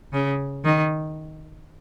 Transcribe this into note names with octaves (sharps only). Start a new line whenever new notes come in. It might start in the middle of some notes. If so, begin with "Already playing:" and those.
C#3
D#3